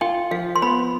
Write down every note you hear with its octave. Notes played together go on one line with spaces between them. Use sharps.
F4 G5
F3 F5
C6
B3 B5